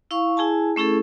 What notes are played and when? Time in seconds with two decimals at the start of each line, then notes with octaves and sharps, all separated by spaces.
0.11 E4 F5 C#6
0.37 E4 G#4 G#5 A5
0.76 A3 C#4 E4 G#4 A4